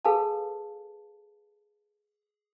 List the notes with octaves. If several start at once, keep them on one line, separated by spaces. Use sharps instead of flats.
G#4 A4 B4 F5 G#5 A5